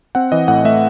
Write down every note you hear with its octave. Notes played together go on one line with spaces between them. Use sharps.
C4 F#5
E3 D#5
A2 F#5
A3 E5